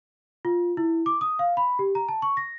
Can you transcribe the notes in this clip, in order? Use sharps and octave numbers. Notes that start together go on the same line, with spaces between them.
F4
E4
D6
D#6
F5
B5
G4
A#5
A5
C#6
A#6